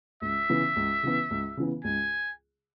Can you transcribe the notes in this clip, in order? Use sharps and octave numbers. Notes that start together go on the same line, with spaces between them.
C#2 E5
C#3 E3 B3
C#2
C#3 E3 B3
C#2
C#3 E3 B3
C#2 G#5